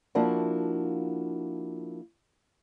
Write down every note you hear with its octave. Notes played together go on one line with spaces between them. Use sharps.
F3 A#3 D4 E4 F#4